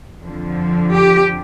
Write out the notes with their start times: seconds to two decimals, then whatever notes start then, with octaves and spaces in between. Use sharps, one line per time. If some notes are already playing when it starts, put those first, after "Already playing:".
0.21 F2 D3 F3
0.94 G4